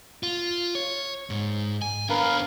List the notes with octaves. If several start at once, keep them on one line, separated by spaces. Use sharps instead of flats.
F4
C#5
G#2
G#5
B3 D4 A#4 B4 F5